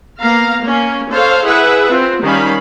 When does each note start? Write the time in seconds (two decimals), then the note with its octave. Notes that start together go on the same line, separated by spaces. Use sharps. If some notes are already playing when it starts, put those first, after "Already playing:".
0.18 A#3 B3 F5 A#5
0.62 A#3 C#4
1.09 A4 C5 C#5 F5
1.44 E4 G#4 B4 E5 F#5
1.88 C4 F4
2.21 D#3 G3 C#4 F5 B5